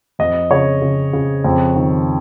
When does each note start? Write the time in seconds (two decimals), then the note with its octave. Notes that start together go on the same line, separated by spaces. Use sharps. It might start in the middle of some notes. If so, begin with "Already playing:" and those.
0.19 F2 D#5
0.51 C#3 C#5
0.82 C#3
1.13 C#3
1.44 F2
1.76 D#3